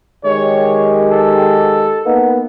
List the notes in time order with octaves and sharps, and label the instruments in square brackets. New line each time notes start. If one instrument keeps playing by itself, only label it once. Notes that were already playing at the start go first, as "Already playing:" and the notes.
[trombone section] D#3 G#3 G4 [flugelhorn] C#5
[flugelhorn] A4
[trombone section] A#3 B3 D#4